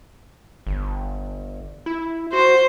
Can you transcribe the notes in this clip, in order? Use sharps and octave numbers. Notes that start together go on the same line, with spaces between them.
G1
E4
F#4 C5